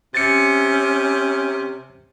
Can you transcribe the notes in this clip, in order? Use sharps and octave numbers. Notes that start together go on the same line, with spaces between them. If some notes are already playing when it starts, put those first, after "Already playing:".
C3 C#4 A6 C#7